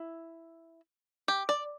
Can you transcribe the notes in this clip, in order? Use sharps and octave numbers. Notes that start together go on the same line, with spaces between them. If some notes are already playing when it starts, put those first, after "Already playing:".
Already playing: E4
G4
D5